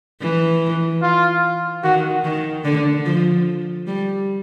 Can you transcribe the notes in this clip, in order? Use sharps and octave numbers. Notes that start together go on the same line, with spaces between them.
E3
F4
D#3 F#4
D#3
D3
F3
G3